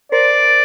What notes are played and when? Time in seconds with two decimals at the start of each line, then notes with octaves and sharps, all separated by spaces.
0.12 A#4 C5 D5